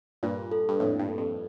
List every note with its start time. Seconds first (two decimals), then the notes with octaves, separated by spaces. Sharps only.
0.23 G2 A#2 F4
0.52 A4
0.69 G2
0.80 F2 A2 A#3
0.99 G2
1.08 A4
1.18 F2